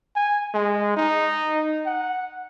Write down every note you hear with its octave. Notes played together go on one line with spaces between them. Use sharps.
G#5
G#3
D#4
F#5